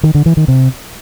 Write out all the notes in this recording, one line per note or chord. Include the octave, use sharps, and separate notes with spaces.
D#3
D3
E3
D#3
C3